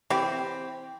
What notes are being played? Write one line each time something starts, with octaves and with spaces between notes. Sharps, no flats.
E3 C4 G4